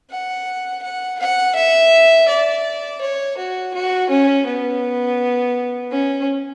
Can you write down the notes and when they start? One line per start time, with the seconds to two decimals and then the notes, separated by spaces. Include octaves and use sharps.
0.10 F#5
0.83 F#5
1.19 F#5
1.55 E5
2.28 D5
3.01 C#5
3.37 F#4
3.74 F#4
4.10 C#4
4.46 B3
5.91 C#4